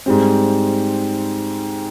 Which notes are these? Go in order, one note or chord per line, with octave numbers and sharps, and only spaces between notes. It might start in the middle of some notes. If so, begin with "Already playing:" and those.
G#2 G3 C4